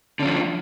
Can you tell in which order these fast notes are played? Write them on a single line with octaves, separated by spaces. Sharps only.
D3 C#4 F3